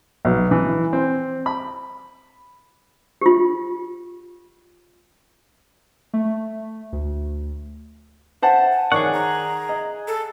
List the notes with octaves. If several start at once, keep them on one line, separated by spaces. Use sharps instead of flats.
B1
E3
C4
B5
F4 G4
A3
D2
C5 E5 F#5 A5
G#5
D#3 G#4 C#5 D5 F#5 C#6
A#5
D#5
A4